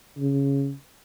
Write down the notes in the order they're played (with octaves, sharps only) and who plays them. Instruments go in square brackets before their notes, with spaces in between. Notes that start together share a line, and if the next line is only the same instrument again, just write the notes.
[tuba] C#3